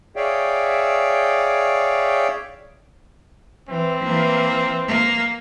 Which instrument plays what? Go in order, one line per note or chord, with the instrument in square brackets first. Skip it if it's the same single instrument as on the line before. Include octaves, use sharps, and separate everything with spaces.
[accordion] G#4 C#5 D5 E5 F5 G5
[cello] E3 [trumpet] C4
[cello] E3 A#3
A#3